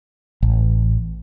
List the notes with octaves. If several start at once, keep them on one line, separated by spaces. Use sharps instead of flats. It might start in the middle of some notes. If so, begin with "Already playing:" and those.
A1